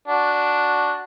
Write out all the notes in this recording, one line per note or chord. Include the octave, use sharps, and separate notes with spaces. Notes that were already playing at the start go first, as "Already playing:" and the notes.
D4 F#4